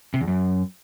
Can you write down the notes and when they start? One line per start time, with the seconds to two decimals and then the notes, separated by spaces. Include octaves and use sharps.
0.14 C3
0.21 E2
0.27 F#2